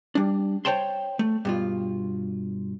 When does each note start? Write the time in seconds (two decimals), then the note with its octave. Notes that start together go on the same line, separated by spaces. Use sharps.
0.15 G3 D4
0.65 C5 C#5 G5 A5 C6
1.19 A3
1.45 G2 B2 F4